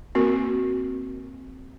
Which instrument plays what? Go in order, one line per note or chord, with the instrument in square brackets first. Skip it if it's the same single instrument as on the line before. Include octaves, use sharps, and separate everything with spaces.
[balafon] A#3 C4 F#4 A#4